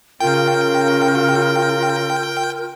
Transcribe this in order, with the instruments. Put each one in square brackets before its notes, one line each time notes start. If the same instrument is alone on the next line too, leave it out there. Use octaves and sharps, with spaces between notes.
[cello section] C#3 [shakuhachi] F4 [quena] A#4 [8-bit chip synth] G5